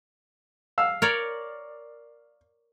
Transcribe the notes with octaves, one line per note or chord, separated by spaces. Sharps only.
F5 E6
A#4 C#5 D5